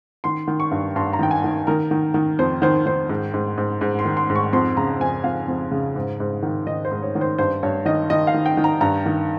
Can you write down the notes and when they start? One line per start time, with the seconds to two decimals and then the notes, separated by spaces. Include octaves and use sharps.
0.24 D#3 C6
0.48 D#3
0.60 C#6
0.71 G2
0.96 G2 C6
1.13 A#5
1.19 D#3 G5
1.31 G#5
1.44 D#3
1.67 D#3 A#4
1.91 D#3
2.14 D#3
2.39 F2 C5
2.62 D#3 C5
2.86 D#3 C5
3.09 G#2
3.34 G#2
3.58 G#2
3.81 G#2
3.99 C6
4.05 D#3
4.17 C6
4.30 G#2
4.36 C#6
4.53 F2 C6
4.77 C#3 A#5
5.00 F2 G#5
5.24 F2 F5
5.48 F2
5.71 C#3
5.96 G#2
6.20 G#2
6.43 D#3
6.67 D#3 D#5
6.85 C5
6.91 G#2
7.03 C#5
7.15 D#3
7.21 C5
7.38 G2 C5
7.63 G2 C#5
7.85 D#3 D#5
8.10 D#3 D#5
8.27 F5
8.34 D#3
8.46 G5
8.57 D#3
8.64 A#5
8.81 G2 A#5
9.06 D#3